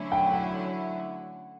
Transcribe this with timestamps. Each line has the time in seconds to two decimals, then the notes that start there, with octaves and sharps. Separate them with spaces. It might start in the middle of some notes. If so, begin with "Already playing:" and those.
Already playing: D3 F#3 A3 C#4 E4
0.12 G5
0.31 F#5